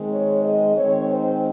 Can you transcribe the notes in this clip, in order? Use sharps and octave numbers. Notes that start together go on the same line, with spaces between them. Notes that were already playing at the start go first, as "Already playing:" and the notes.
Already playing: D#3 G#3 C4
C#5
D#5
D#3 G#3 C4 C#5
C5